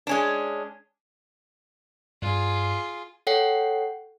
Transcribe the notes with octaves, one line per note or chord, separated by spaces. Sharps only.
G#3 C#4 D4
G2 F4 G#4
A4 C#5 F#5 G5 C7